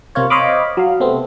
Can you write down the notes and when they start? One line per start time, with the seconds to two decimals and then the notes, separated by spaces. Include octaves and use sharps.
0.15 C3 A#3 F4 C#5
0.30 C5 C#5 D#5 F5 B5 D6
0.77 F#3 F5
1.00 C3 A3 B3 C4